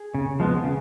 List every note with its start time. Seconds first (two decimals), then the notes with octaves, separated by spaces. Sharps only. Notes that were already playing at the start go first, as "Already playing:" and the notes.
Already playing: G#4
0.15 C#3
0.40 F3 G#3 B3
0.64 C#3